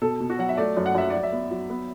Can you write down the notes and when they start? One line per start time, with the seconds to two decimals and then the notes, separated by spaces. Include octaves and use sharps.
0.01 B2 A4
0.20 B2
0.30 F#4
0.39 F#3 F#5
0.49 E5
0.57 A3 D5
0.77 F#2
0.86 F#5
0.95 F#2 E5
1.10 F#3 D5
1.23 E5
1.32 B3
1.51 F#3
1.70 B3